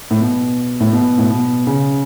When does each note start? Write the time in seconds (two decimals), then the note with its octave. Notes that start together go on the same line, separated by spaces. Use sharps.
0.11 A2
0.20 B2
0.80 A2
0.93 B2
1.18 A2
1.30 B2
1.67 C#3